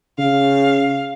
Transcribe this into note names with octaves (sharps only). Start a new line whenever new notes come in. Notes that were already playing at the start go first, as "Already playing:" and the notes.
C#3 F5